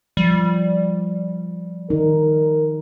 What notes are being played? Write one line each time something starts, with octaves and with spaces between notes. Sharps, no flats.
F3 G3
D#3 D#4 A#4